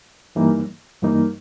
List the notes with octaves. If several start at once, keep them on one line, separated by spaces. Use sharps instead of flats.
G2 E3 G3 A#3 D#4
G2 E3 G3 A#3 D#4